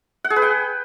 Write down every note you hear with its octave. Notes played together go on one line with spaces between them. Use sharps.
F#5
G#4
B4
G5